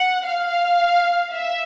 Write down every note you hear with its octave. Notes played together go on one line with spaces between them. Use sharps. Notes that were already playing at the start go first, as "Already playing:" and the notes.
Already playing: F#5
F5
E5